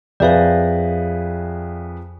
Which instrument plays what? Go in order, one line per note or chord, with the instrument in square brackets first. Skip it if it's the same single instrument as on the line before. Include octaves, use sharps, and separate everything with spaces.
[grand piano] F2 G#4 B4 [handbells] D5 E5 F5